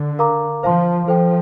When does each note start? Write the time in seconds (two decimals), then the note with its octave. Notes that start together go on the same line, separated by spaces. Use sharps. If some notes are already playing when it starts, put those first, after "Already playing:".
Already playing: D3
0.19 A#4 F5 A#5 D6
0.63 F3 C5 F5 A5 C6
1.08 F3 A4 C5 G5